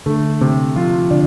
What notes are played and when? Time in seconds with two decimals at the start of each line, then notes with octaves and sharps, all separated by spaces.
0.06 D3 A3
0.41 C3
0.76 F3 F4
1.11 D3 D5